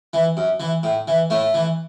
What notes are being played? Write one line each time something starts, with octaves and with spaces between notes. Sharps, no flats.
E3
F#2
E3
A2
E3
A2 A3
E3